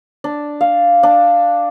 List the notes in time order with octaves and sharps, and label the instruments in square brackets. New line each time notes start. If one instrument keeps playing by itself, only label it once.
[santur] D4
F5
D4